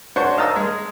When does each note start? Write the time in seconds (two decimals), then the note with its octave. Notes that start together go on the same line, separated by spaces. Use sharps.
0.16 C#4 D4 F#4 C5 C#6
0.37 D#5 F5 A5 A#5 D#6 E6
0.56 G#3